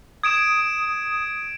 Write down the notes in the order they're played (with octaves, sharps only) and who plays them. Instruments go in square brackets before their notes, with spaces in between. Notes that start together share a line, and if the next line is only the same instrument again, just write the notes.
[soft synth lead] D#6 [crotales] G#6 D7 E7